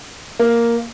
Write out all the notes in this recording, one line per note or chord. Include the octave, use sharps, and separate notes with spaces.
A#3